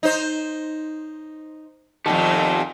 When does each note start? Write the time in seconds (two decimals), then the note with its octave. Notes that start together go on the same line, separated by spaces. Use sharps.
0.03 D#4 C5
2.06 F2 A#2 D#3 G4 F#5 A5